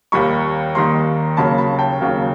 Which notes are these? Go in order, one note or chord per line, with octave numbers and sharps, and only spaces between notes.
D#2 D#3 G3 A#3 B5 C#6
D#2 D#3 G3 A#3 A#5 C6
D#2 C#3 F#3 A#3 A5 B5
A5 B5
G5 A5
D#2 C#3 F#3 A#3